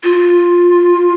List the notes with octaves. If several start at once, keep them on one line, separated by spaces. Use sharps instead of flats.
F4